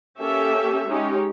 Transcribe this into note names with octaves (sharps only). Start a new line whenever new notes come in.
A#3 C#4 G4 A4 E5
G#3 C#4 D#4 G4